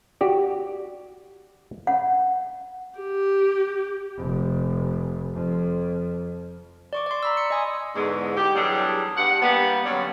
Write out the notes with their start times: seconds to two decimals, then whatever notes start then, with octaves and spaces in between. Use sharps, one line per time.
0.21 F#4 G4 D5
1.87 F#5
2.99 G4
4.18 F1
5.33 F2
6.93 D5 C#6 D6
7.06 D5 C6
7.23 A#5 B5 E6
7.37 B5 C6 C#7
7.50 D#5 G#5 D#6
7.95 E2 G#2 D3
8.37 G4
8.55 E2 F#3 G3 D4 G#4 A4
9.16 G2 F#5
9.41 G3 A#3 B3
9.85 D3 F#3 G3 C#4 D4